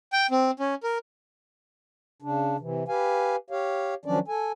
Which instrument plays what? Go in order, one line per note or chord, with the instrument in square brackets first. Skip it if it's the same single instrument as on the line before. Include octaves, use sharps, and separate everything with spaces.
[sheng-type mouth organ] G5
C4
C#4
A#4
[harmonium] C#3 D4
C3 E3
G4 B4 F5 G#5
G4 C#5 F5
D#3 F3 F#3 C#4 D4 D5
A4 G#5